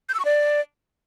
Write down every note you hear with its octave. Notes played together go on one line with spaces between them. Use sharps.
G6
E6
C#6
D5